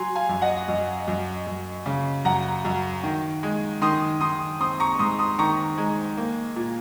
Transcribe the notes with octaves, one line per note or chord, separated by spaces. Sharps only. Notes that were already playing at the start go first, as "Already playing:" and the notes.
Already playing: F#3 G#5 C6
F5 G#5
F#2
D#5 F#5
F#2
F#2
F#2
C#3
F#2 F#5 A#5
F#2
D#3
G#3
D#3 C6 D#6
D#3 C6 D#6
C4 C6 D#6
A#5 C#6
G#2 C6 D#6
C6 D#6
D#3 A#5 C#6
G#3
A#3
A#2